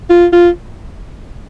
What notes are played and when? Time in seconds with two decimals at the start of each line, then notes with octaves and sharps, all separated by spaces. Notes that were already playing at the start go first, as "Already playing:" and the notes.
0.10 F4
0.33 F4